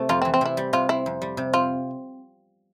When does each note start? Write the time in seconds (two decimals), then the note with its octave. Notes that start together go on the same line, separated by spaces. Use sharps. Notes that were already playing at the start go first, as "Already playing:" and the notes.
Already playing: C3 A3
0.09 F2 F4
0.22 C4
0.25 E3
0.34 C4
0.41 C3 E4
0.57 G3
0.73 C3 F4
0.89 C4 E4
1.06 F2
1.22 G3
1.37 C3
1.53 C4 F4